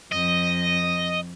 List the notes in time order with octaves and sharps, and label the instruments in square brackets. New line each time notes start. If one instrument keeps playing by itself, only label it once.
[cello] F2 [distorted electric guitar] D#5